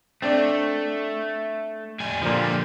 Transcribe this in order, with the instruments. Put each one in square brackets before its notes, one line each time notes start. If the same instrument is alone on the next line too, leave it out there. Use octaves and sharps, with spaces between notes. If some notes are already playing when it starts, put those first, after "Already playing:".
[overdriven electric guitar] A3 [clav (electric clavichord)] C4 D4 D5
[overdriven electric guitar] G3 G#5
[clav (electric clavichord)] A#2 F3 [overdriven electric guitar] D3 G3